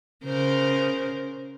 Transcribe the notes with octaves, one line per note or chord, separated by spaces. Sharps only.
C#3 A#4 C5